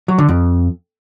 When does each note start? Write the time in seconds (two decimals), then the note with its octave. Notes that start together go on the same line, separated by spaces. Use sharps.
0.08 F#3
0.18 D3
0.29 F2